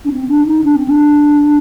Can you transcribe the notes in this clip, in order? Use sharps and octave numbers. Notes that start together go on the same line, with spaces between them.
D4
C4
D4
D#4
D4
C4
D4